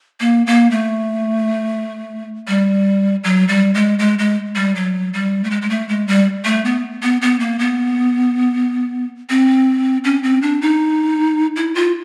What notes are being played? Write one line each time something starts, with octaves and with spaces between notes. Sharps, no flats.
A#3
A#3
A3
G3
F#3
G3
G#3
G#3
G#3
G3
F#3
G3
A3
G#3
G#3
A3
G#3
G3
A3
B3
B3
B3
A#3
B3
C4
C#4
C4
D4
D#4
E4
F4